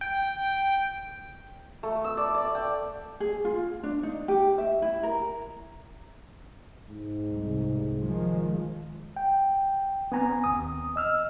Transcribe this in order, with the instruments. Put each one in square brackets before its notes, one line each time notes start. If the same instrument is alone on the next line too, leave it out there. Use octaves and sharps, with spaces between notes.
[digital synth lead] G5
[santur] A3
E6
D5
D5
G5
[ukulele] G#4
F4
D4
D#4
G4
E5
E4
A#4
[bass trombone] G#2
[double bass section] C2
D#3 F3 G#3
[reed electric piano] G5
B3 C4 G#5 A#5
D#2 D#6
D#5 E6 F6